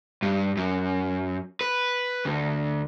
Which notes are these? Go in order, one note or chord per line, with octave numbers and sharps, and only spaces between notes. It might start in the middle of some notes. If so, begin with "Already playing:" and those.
G2
F#2
B4
D2